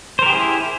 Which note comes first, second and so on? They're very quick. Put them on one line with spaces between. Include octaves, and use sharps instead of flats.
C5 A#4 G4 G#4 E4